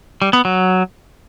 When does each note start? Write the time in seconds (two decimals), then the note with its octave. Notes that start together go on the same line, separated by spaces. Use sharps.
0.22 G3
0.33 B3
0.45 F#3